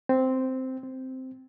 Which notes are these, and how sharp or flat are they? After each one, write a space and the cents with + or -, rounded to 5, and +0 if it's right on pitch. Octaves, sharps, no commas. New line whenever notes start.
C4 -5
C4 -5